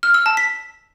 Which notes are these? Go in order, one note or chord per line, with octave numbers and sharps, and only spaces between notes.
F6
E6
A5
B6